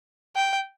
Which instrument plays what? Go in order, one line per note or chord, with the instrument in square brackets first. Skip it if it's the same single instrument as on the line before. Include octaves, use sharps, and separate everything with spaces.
[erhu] G5